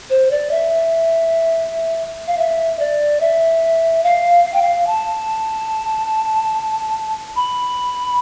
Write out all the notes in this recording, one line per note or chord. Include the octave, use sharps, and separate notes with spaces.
C5
D5
E5
F5
E5
D5
E5
F5
F5
G5
F5
A5
B5